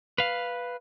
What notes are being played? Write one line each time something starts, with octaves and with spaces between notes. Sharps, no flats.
B4 F5